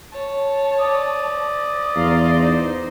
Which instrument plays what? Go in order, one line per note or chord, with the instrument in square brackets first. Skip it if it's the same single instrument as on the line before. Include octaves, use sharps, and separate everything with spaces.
[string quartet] C#5 A5
[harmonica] D5 D#6
[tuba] E2 [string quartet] F5 A#5 C6
[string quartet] D#4 C5